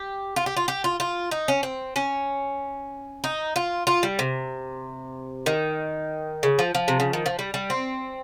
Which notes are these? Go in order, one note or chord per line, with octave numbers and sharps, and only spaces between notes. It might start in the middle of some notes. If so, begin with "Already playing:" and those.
Already playing: G4
F4
G4
F4
G4
F4
F4
D#4
C#4
C4
C#4
D#4
F4
F4
G3
C3
D#3
C#3
F3
F3
C3
C#3
D#3
F3
G3
G3
C4